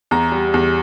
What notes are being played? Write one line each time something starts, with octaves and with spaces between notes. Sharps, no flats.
E2 A#5
G3
E2